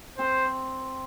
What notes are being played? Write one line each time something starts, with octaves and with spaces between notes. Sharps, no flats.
C4 C5